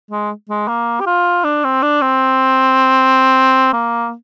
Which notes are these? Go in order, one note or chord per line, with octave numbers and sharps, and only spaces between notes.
G#3
G#3
A#3
G4
F4
D4
C4
D4
C4
A#3